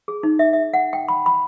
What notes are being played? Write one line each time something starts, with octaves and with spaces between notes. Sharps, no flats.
G#4
D#4
E5
E5
F#5
G5
B5
B5